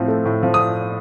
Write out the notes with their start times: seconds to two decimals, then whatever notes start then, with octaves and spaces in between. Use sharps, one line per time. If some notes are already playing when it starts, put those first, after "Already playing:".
Already playing: A2 F3 C4
0.08 A3
0.25 A2
0.43 F3
0.54 D#6